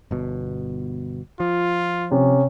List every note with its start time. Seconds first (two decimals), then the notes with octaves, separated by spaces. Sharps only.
0.11 G1 B2
1.40 F3 F4
2.11 C3 C#4